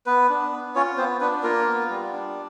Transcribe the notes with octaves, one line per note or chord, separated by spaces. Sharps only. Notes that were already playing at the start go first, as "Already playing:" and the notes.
B3 B4
D4
B3
C#4 F4 C#5
B3 C4 C5
B3 D4 B4
A#3 F4 A#4
B3
G3
D4